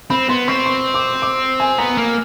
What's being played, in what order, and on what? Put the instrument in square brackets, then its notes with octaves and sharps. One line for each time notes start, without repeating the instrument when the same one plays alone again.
[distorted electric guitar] C4 [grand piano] B5
[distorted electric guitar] B3 [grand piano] C6
[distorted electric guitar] C4 [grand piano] C#6
[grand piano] C#6
D6
D6
G#5
[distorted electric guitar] B3 [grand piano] A#5
[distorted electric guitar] A#3